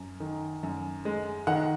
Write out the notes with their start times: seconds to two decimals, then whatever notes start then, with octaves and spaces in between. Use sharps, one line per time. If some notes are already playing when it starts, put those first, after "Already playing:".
Already playing: F#2
0.20 D#3
0.63 F#2
1.05 G#3
1.47 D#3 F#5